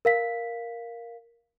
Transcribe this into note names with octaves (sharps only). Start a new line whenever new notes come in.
A#4 F5 B6